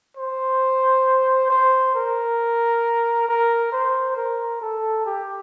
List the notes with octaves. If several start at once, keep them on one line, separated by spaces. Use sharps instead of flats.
C5
C5
A#4
A#4
C5
A#4
A4
G4